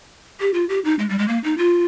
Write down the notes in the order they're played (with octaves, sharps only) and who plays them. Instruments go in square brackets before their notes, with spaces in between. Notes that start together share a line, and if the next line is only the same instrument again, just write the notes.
[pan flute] G4
F4
G4
D#4
G#3
G3
G#3
A#3
D#4
F4